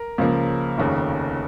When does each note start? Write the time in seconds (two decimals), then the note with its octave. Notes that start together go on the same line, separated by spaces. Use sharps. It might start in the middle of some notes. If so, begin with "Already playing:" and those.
Already playing: A#4
0.18 C#2 C#3 F3 A#3
0.78 F1 D#2 C#3